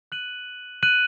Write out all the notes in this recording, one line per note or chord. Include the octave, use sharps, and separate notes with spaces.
F#6 D#7 F#7
F#6 D#7 F#7